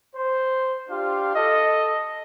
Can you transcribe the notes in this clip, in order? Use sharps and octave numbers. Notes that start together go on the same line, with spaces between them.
C5
D4 F4 G4 F5
A4 D#5